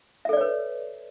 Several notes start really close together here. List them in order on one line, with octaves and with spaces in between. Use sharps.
E5 A4 D5 C#5 B4